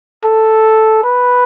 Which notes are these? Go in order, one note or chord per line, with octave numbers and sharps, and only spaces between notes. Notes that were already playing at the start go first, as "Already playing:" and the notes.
A4
B4